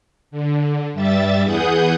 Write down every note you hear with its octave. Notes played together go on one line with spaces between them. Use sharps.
D3
G2 G3 E5 A6
E2 E3 G#4 F#5 D#6 G6